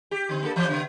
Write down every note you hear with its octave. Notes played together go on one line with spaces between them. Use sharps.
G4
D3 C4
A#3 D4 A4
E3 F3
C#3 B3